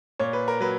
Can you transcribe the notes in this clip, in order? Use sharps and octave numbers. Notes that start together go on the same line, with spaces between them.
A#2 C#5
B4
A#4
F#3 B4